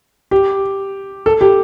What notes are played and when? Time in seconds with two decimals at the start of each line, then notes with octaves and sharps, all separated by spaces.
0.31 G4
1.26 A4
1.41 G4